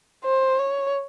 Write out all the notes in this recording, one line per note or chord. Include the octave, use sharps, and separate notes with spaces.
C5
C#5